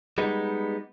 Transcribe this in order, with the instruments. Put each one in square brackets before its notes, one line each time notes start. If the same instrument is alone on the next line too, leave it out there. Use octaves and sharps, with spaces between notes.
[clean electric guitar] G3 G#3 B3 D#4